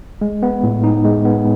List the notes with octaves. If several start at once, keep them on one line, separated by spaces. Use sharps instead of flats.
G#3
B3
A2
D#4
G#3
B3